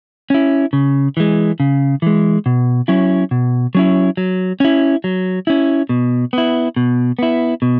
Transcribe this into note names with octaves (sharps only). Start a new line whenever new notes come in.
C#4 E4
C#3
E3 G#3
C#3
E3 G#3
B2
F#3 C#4 E4
B2
F#3 C#4 E4
F#3
C#4 E4
F#3
C#4 E4
B2
B3 E4
B2
B3 E4
B2